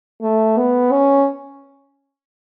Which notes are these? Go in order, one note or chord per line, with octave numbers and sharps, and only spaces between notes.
A3
B3
C#4